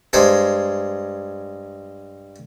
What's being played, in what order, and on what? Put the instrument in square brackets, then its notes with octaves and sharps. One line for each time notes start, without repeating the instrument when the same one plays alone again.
[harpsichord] G2 G#3 C5 B5